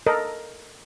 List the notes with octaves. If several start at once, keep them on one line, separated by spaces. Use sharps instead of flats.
A4 A#4 D#5